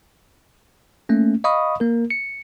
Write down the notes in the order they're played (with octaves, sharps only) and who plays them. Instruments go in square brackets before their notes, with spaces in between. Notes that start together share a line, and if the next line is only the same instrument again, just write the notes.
[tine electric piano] A3 A#3 C#4
D#5 F5 B5 C#6 D#6
A#3 A#4
C#7